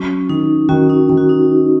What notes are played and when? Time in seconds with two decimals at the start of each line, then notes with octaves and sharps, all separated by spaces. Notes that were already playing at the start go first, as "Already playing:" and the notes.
Already playing: F#3 C#4
0.29 D#3 D#4
0.69 D#3 C#4 F#4
0.89 D#4
1.09 D#3
1.17 F#4
1.29 D#4